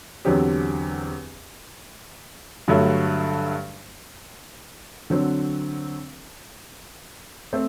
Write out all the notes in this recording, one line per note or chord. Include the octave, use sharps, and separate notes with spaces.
E2 D3 F#3 C4 G4
G2 D3 F#3 A3
D3 F#3 C4
A3 C4